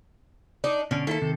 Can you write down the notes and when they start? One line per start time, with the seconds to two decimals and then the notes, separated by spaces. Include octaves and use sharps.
0.64 D4 D#4
0.91 B2 D3 C#4 D5
1.07 D#3 A#3 E4 A4 A5
1.22 C3 D#3